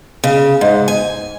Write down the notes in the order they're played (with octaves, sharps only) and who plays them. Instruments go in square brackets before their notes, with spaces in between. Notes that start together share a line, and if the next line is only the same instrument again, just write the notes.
[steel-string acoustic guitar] C#3
G#2
G#5